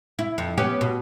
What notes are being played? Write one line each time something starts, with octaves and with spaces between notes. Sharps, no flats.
E4
F2
B3 C#4 G4
B2